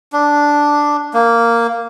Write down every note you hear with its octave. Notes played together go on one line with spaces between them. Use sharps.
D4
A#3